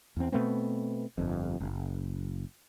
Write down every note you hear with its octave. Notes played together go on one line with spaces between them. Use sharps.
E2 C4
B2 A3 B3 C4
G1 F2
F#1